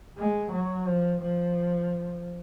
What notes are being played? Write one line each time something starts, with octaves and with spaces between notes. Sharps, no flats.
G#3
F#3
F3
F3